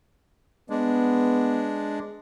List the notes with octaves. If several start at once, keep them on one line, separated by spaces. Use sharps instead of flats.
G#3 B3 D4